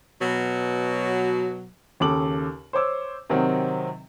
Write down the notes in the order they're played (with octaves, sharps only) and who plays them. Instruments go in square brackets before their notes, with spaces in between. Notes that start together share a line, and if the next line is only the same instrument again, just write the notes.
[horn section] B2 F#3
[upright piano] D#2 C#3 A4 D6 F#7
C5 C#5 D6 E6
C3 D#3 F#3 C4